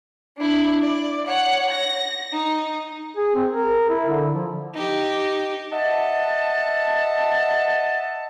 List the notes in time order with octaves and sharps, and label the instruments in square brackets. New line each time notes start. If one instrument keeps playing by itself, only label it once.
[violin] D4 E4
D5
C#5 F#5
A#6
D#4
[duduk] G#4
C4
A#4
E4
D3
F3
[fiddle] D#4 G4
[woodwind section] D#5 E5 F#5 A5